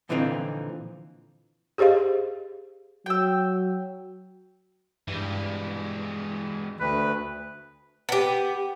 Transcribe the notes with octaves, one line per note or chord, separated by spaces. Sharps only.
A#2 D3 E3 F3 C4 D#4
G4 G#4 C5 D#5 F5
F#3 G5 E6
G2 E3 G#3
D2 B4
B3 G4